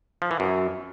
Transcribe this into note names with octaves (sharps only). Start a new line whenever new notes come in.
F3
E3
F#2